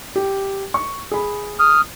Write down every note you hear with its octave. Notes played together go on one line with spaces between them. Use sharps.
G4
C#6
G#4 B5
D#6 F6